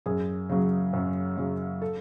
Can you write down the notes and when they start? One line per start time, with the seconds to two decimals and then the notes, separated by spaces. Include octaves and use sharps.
0.06 F#2 G#4
0.49 C#3 F#3
0.93 F#2
1.37 C#3 F#3
1.82 A4